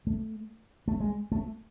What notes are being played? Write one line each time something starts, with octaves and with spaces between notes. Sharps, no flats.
A3
A3
G#3
A3